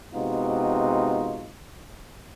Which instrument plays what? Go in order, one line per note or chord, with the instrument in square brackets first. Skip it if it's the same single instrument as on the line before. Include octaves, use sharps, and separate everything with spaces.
[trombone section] C3 G#3 B3 D#4 F4 F#4